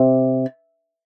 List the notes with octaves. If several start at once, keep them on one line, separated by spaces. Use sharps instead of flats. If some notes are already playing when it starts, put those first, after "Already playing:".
Already playing: C3